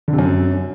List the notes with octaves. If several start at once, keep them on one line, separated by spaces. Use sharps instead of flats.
D3
C3
F#2